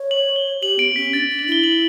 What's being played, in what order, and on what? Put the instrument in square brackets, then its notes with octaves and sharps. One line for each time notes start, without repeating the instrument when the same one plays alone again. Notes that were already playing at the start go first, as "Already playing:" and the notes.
Already playing: [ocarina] C#5
[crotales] F#7
G7
[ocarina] G4 [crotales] F#7
[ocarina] B3 [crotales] D7
[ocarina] C#4 [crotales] B6
[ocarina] D4 [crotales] A6
[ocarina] D4
[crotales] F#7
[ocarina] E4 [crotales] G7
[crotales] F#7